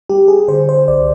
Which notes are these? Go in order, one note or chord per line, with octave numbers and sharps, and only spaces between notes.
G3 G4
G#4
D3 C5
C5
C2 D5